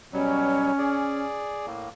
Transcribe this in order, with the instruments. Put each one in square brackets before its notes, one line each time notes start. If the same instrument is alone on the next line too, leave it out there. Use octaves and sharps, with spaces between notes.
[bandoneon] B2 F#3 G3 [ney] C#4
[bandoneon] G#4 D5
A2 A#3